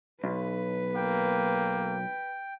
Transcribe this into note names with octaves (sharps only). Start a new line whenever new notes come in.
B1 B4
A#3 G5